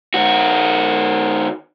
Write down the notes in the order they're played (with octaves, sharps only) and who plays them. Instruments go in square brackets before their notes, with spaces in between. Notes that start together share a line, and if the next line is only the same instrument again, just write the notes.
[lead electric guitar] D#3 F#4